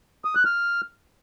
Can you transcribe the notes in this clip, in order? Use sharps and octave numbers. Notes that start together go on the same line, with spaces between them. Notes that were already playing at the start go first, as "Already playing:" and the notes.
D#6
F#6
F6